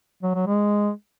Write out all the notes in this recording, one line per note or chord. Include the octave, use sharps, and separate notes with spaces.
F#3
F#3
G#3